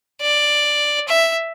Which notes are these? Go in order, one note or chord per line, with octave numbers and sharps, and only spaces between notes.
D5
E5